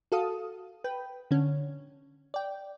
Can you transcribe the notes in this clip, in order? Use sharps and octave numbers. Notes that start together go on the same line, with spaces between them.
F#4 A4 F5 D#6
B4 G5
D3 C#4
D5 G5